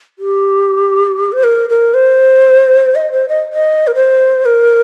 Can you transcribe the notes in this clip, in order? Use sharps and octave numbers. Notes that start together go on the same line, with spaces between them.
G4
C5
A#4
A#4
C5
D#5
C5
D#5
D#5
A#4
C5
A#4